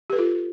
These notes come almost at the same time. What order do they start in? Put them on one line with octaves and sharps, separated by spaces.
G4 B4 A4 F4